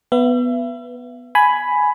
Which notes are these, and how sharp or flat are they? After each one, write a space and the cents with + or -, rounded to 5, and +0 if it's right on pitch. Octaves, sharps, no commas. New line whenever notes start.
B3 +0 E5 +40
G#5 +10 B5 +5